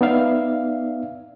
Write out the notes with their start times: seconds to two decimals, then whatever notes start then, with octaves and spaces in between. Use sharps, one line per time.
0.01 B3 D#4 D5 E5 F5